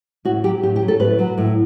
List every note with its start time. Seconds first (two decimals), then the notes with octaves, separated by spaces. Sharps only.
0.25 A2 F#4
0.44 F#3 G4
0.63 A2 G4
0.76 G4
0.82 F#3
0.88 A4
1.00 A2 B4
1.19 F#3
1.38 A2